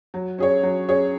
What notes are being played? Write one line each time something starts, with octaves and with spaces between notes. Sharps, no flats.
F#3
C#4 G#4 C#5
F#3
C#4 G#4 C#5